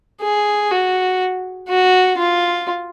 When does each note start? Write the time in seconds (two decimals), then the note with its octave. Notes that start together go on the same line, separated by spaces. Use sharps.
0.21 G#4
0.72 F#4
1.69 F#4
2.18 F4